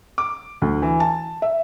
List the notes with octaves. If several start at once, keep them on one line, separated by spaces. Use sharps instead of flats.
D6
D2
E3
A5
E5